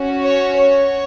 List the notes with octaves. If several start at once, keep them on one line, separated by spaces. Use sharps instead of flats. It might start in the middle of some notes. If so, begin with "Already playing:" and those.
Already playing: C#4 F#4
C#5
C#5